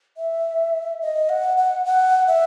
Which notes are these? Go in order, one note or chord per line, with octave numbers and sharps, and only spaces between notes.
E5
D#5
F#5
F#5
F#5
E5